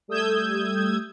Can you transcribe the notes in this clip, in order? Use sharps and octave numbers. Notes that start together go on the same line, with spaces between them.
G3 A3 D#6 E6 G6 G#6